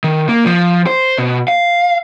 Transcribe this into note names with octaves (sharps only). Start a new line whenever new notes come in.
D#3
A#3
F3
C5
B2
F5